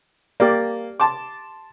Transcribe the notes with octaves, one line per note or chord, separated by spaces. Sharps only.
A#3 G4 D5
A5 C6 D6